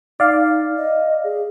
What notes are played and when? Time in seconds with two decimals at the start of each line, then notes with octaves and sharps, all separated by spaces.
0.20 D#4 D5 F5
0.78 D#5
1.24 G#4